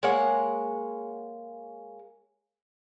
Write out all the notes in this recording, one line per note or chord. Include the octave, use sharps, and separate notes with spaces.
G#3 A#3 C#5 F#5